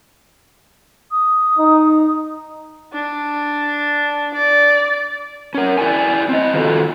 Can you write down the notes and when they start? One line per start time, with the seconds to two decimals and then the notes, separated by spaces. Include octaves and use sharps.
1.11 D#6
1.58 D#4
2.93 D4
4.34 D5
5.54 C#4 A#4
5.78 E4 D5 G5 G#5
6.29 C4 D#5
6.53 D#3 F4 F#4 A4